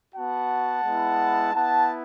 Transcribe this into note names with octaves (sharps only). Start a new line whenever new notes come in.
B3 F#4 F#5 A5
G#3 B3 E4
B3 E4 F#5 A5